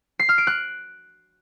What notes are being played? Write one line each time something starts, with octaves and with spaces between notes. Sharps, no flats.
C7
F6
D7
F#6